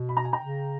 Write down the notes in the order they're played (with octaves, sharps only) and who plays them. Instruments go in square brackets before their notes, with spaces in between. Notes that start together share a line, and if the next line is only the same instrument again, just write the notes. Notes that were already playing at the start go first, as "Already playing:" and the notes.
Already playing: [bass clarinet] B2
[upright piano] B5
A#5
G#5
G5 A#5
[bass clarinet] C#3